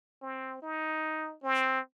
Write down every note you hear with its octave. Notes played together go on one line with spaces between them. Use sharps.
C4
D#4
C4